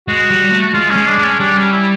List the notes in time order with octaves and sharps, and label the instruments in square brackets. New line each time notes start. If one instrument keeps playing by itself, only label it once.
[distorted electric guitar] G#3 [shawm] F#4
[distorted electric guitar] G3
A3
[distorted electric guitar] G#3 [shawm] F4
[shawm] C#4
[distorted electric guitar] G#3
[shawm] D4
[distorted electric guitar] G#3
[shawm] C#4
[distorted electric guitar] G3 [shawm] D4
[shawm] C#4
E4